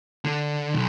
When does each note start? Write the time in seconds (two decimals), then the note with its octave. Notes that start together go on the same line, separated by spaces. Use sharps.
0.24 D3
0.73 B1